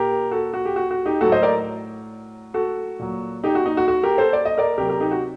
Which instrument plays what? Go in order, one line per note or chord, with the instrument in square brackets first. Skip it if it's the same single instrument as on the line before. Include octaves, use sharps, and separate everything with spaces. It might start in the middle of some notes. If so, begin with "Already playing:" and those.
Already playing: [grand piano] A#2 G4 A#4
F#4 A4
F#4
G4
F#4
F#4
D#4 G4
A2 F#3 F#4 A4
C5 D#5
A#4 D5
F#4 A4
A#2 F#3
D#4 G4
F#4
D#4
F#4
F#4
G4 A#4
A4 C5
D5
D#5
A#4 D5
C3 G4 A#4
F#3
G4 A#4
D#4 G4
F#4